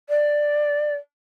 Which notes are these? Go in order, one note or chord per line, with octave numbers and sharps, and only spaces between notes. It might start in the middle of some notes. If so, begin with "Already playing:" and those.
D5